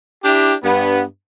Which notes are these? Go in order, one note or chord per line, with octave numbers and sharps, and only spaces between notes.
D4 E4 G4
G2 B3